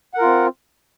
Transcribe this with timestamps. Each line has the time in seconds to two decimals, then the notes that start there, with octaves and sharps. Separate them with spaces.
0.14 F#5
0.18 A#4
0.22 F4
0.25 C4